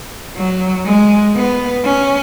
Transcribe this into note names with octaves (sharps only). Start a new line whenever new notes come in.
F#3
G#3
B3
C#4